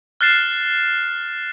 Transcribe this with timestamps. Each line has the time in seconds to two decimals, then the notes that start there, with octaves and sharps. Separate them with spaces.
0.21 F6 F#6 A6 C7 E7